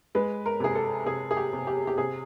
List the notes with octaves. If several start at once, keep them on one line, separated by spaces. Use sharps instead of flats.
G#3 B4
A#4
C3 G#4
A4
C3 G#4
G#4
G4
C3
G4
G4
C3 G#4